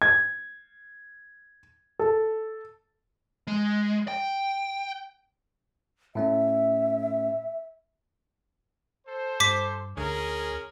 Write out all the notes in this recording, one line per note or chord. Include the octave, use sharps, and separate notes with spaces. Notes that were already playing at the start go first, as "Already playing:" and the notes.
G#6
A4
G#3
G5
A2 A3 C#4 E5
A4 C5
G2 D6 B6
D2 C#4 G#4 A#4